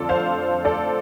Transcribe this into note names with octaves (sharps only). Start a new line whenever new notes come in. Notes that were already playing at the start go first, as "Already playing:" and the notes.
Already playing: F2 D3 A3 F4 A4 D5
C5 F5
A4 D5